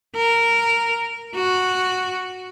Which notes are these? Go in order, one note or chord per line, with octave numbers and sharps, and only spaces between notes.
A#4
F#4